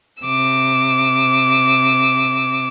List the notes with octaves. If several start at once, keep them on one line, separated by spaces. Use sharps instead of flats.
C3 D6 E6